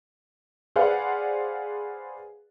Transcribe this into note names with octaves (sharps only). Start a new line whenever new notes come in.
G#4 B4 C5 D5 F5 F#5